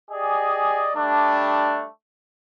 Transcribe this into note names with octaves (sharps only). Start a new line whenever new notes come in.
G4 G#4 D5 D#5 G#5
G3 A3 D4